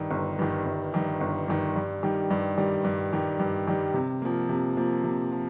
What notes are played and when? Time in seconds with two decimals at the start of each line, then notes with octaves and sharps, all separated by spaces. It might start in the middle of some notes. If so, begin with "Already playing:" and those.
Already playing: G2 D#3
0.11 G1
0.39 G2 D#3
0.66 G1
0.94 G2 D#3
1.21 G1
1.48 G2 D#3
1.76 G2
2.03 D#3 G3
2.30 G2
2.58 D#3 G3
2.84 G2
3.13 D#3 G3
3.39 G2
3.68 D#3 G3
3.94 C3
4.22 F3 A#3
4.49 C3
4.77 F3 A#3
5.04 C3
5.32 F3